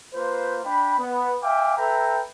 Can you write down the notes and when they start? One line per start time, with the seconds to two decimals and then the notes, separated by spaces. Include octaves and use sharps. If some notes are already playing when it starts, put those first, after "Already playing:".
0.14 A#3 F4 B4 C5
0.64 D4 G5 B5
0.99 B3
1.42 E5 F5 G5 G#5 D6
1.77 A4 B4 E5 G5 A#5